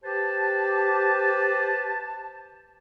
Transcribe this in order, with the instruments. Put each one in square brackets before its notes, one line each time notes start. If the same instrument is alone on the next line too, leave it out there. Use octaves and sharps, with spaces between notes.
[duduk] G4 [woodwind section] B4 C5 A5